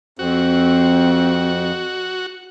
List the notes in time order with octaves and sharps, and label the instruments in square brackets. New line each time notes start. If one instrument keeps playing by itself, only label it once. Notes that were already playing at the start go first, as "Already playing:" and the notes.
[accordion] F2 [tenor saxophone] C4 [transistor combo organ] F#4